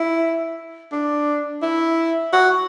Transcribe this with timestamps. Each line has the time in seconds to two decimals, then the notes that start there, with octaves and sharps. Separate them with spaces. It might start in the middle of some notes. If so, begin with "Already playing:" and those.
Already playing: E4
0.92 D4
1.62 E4
2.33 F#4